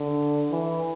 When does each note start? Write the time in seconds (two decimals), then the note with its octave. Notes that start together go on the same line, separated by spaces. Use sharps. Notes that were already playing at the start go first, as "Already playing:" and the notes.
Already playing: D3
0.51 E3